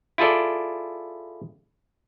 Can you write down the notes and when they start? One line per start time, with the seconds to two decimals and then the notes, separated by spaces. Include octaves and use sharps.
0.18 E4 F4 G#4 A4 D5